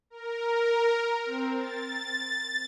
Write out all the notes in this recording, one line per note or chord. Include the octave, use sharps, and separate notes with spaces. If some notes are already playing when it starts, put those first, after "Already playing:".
A#4
C4
A6